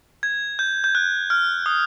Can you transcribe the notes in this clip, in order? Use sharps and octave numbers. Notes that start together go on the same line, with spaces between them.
G#6
G6
G6
F#6
F6
D#6